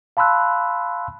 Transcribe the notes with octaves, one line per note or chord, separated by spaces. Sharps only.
F5 A5 B5 C6 E6 F#6